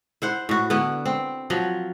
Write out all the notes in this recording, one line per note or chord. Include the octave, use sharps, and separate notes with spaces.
E4 C5 F#5
A2 F#4
D3 B3 E4
C4
F3 F#3